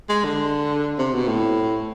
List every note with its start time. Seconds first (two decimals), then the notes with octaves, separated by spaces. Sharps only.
0.09 G#3
0.24 D3
0.98 C3
1.14 B2
1.28 A2